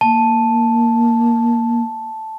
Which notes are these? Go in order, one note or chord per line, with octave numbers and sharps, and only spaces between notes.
A#3 A5